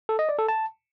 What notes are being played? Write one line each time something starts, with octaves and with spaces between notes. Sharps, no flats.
A4
D#5
D5
A4
A5